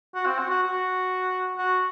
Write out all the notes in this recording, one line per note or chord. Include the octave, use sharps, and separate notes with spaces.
F#4
C4
F#4
F#4
F#4
F#4